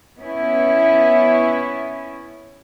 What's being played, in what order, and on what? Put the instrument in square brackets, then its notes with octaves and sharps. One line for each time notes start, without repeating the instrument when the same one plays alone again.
[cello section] B3 C#4 E4